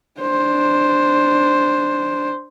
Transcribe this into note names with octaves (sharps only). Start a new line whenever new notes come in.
D4 C5